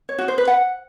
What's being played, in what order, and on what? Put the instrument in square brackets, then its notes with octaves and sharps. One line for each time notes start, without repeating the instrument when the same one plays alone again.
[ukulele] C#5
F#4
C5
B4
F#5